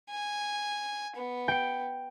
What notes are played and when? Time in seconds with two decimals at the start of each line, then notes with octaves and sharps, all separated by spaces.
0.10 G#5
1.17 B3
1.48 G5 C#7